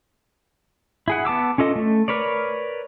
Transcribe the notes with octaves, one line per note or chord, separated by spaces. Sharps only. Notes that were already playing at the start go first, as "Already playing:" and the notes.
E4 G#4 F#5
B3 A5 D6 E6
C#4 F4 A4 D#5
A3
A#4 B4 C#5 D5